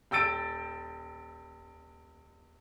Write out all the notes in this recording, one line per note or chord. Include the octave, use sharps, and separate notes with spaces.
D#1 G5 E6 A6 D7